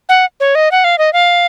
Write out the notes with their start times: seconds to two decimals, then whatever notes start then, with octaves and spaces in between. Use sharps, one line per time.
0.09 F#5
0.40 C#5
0.55 D#5
0.71 F#5
0.84 F5
0.98 D#5
1.13 F5